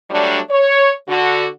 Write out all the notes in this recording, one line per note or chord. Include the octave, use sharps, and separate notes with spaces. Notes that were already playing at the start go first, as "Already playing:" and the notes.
F#3 G3 A3 D4
C#5
D3 F#4